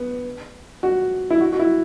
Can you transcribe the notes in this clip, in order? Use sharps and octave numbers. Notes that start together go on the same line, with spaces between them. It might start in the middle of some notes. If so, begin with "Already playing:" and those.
Already playing: B3
F#4
E4
F#4
F#4
E4